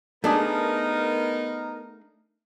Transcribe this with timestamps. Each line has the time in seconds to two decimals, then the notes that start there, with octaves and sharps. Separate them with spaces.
0.24 A3 B3 D4 D#4 G#4 A#4